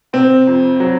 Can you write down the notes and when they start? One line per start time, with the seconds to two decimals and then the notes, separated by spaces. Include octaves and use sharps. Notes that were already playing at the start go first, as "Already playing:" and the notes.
0.13 C3 C4
0.47 F2
0.80 F#3